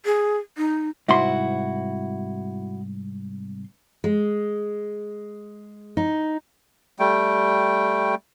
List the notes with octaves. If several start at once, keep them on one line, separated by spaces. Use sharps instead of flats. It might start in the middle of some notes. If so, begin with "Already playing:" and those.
G#4
D#4
C2 G#2 E4 F#4 C6
G#3
D#4
G3 A3 G5